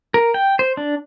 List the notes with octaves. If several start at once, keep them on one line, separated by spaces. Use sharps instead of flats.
A#4
G5
C5
D4